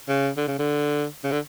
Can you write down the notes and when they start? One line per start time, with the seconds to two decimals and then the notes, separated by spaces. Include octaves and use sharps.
0.09 C#3
0.37 D3
0.48 C#3
0.59 D3
1.24 C#3
1.31 D3